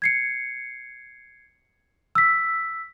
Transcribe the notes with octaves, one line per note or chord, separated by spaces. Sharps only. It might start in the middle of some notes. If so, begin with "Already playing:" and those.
G#6 C7 C#7
E6 B6